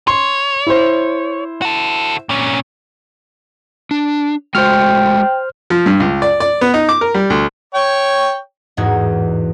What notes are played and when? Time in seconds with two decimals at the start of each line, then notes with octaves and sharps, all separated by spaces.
0.07 C#5 C6
0.67 E4 C5
1.62 F#4 A4
2.29 A#2 C#4
3.91 D4
4.55 G#3 A3 F#4 C5 G5 F6
5.70 F3
5.86 G2
6.00 C#2
6.22 D5
6.40 D5
6.61 B3
6.74 D#4
6.89 D6
7.01 A#4
7.14 G3
7.30 D2
7.74 C#5 G5
8.77 A1 E2 G#2 D#4 F#4 G#6